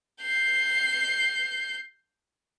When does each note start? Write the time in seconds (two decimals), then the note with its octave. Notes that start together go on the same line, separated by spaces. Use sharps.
0.21 G6 C7